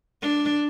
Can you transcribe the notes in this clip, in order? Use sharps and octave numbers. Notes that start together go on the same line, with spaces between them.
D4